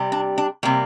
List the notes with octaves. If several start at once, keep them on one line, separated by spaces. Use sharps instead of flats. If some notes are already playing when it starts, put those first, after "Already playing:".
Already playing: C3 G3
D4
D4
C3 G3 A#3